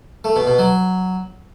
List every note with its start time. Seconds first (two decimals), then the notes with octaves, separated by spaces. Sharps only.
0.24 A3
0.36 B2
0.47 B2
0.58 F#3